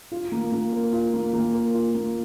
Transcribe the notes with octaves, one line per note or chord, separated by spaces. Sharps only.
F4
A#3
A#3
A#4
F4
A#3
A#3
A#4
F4
A#3